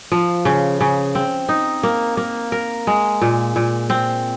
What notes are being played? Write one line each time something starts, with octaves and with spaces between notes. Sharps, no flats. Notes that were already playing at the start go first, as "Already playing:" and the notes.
F3
C#3
C#3
C4
D#4
A#3
A#3
A#4
G#3
A#2
A#2
C4